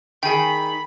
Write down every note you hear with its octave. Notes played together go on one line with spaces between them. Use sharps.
D#3 G#4 G5 G#5 B5